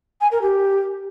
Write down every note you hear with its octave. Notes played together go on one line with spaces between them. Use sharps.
G#5
A#4
G4